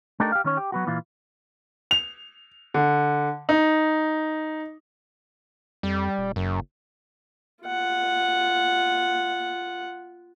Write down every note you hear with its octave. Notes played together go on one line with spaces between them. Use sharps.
A3 D4 D#4 G4 A4 A#4
G4 F5
D#3 C#4 C#5
G4
F#3 B3 F#4
A#2 E3 F4
F7
D3
D#4
F2 G3
D#1
F#1 F#2
F4 F#5